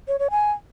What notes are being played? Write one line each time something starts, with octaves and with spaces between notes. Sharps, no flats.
C#5
C#5
G#5